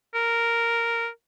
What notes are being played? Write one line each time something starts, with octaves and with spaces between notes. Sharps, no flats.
A#4